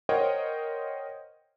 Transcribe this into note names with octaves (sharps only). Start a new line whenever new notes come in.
A#4 C5 C#5 D#5 F#5 G5